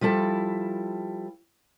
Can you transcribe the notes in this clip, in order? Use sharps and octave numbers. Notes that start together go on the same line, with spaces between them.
F3 G3 E4 A4 A5